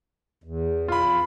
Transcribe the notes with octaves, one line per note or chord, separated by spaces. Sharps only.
E2
F4 B5